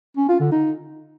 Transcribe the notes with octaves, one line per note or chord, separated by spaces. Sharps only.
C#4
F4
D3
D#4